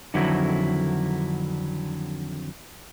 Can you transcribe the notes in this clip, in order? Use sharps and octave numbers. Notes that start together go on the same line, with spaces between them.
F2 D3 D#3 F#3 E4